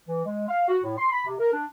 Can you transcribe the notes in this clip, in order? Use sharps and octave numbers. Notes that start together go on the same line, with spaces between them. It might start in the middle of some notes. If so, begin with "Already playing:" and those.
E3
G#3
F5
F#4
A2
C6
B5
C3
A#4
D4